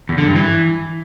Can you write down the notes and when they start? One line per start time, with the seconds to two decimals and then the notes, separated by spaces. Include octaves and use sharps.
0.09 E2
0.18 D3
0.27 G2
0.36 E3